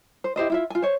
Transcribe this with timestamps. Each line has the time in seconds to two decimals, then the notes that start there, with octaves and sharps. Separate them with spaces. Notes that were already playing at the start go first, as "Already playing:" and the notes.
0.24 C5
0.36 E4 G4 C5 D#5
0.50 E4 F4 E5
0.70 F4 G#5
0.82 C5 C#5